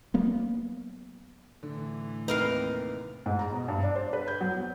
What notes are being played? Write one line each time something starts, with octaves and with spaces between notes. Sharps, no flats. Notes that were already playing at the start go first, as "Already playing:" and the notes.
F#3 A#3 B3
A2 D3 E3
D#2 C3 D#4 A#4 B4 F5
G#2
A#5
B2
G2
D4
C5
B4
G6
F#3
B3